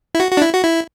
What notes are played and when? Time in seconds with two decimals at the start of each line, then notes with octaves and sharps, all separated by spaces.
0.15 E4
0.20 F#4
0.31 F#4
0.37 D4
0.42 E4
0.53 F#4
0.64 E4